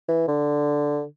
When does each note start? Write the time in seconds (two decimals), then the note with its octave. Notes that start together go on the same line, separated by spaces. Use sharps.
0.08 E3
0.28 D3